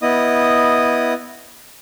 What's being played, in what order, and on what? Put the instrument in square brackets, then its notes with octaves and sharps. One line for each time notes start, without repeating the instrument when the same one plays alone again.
[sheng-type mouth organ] B3 E4 D#5 D#6